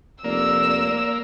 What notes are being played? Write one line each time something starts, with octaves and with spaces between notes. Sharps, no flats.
F1 A#3 D5 E6